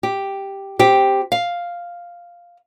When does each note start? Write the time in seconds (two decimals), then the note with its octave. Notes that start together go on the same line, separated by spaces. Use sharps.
0.03 G4
0.79 C4 G4
1.32 F5